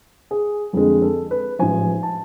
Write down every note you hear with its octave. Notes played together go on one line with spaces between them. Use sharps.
G#4
F2 D3 G#3 G#4
A4
B4
A1 G#2 F3 G#5
A5